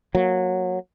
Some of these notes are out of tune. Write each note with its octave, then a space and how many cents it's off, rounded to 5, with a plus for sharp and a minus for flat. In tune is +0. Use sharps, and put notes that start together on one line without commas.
F#3 -15 A#3 +0